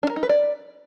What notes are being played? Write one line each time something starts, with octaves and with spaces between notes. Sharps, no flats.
D4
A#4
D#4
B4
D5